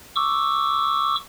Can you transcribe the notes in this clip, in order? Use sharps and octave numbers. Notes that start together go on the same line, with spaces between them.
C#6 D6 E6